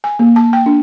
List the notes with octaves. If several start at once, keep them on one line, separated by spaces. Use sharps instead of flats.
G#5
A#3
A5
G5
D4